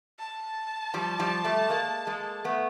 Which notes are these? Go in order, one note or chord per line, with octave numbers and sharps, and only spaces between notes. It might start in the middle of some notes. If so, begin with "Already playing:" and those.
A5
F3 G3
F3 G3
G3 A3
G#3 A#3
G#3 A#3
A3 B3